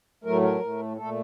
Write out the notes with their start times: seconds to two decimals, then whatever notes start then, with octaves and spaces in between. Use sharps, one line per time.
0.24 A2 F#3 A3 A#4
0.42 A#4
0.61 A2 A3
0.97 A#2 A3 A4